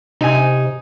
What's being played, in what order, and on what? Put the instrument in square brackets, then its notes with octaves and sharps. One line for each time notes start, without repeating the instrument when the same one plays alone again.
[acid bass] C3 [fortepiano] D#4 G#5